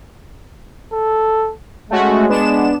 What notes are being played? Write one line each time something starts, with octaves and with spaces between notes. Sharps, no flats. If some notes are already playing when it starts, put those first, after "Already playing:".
A4
G#3 A3 C#4 F#4
B3 D4 E7